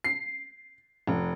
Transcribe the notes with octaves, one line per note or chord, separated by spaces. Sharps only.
C7
F1